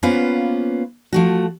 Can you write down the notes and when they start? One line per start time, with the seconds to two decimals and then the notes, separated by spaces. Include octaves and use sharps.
0.03 A#3 B3 C#4 F4 B4 C5
1.13 F3 A3 F#4